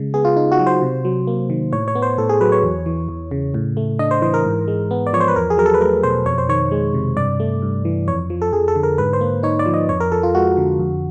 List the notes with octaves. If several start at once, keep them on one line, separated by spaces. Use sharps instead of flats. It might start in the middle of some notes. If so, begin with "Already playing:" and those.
Already playing: C#3 G#3
B3 G#4
F4
D#4 F4
F#4
F#3
C5
C3
F#3
A#3
D#3
A2 C#5
C#5
B3
C5
A2 A4
G#4
F#3 B4
C#5
E2
E3
E2
C#3
A2
A3
D4 D#5
C5
E3 C5
A#4
G#2
G#3
B3
D5
F3 C#5
C5
B4
E2 A#4
G#4
F#3 A#4
A4
B4
A3 A#4
B2 C5
F2 C#5
C5
D#3 C#5
G#3
C3
G2 D5
A3
G2
E3
F2 C#5
F3
A4
F2 G#4
A4
D3
A#4
G#2 B4
C5
A#3
D#4 C#5
D5
F3
D#5
F2 C#5
A#4
F3 A4
F4
G#3 F#4
D3
F2